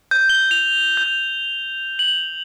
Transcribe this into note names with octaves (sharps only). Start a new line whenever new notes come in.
G6
G7
F7
G6
F#7